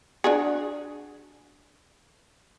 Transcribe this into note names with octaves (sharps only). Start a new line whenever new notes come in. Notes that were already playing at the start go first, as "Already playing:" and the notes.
D4 F#4 G#4